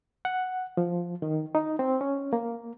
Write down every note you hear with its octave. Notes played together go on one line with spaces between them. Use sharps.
F#5
F3
D#3
D#4
C4
C#4
A#3